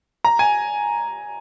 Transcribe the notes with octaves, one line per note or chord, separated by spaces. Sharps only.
A#5
G#5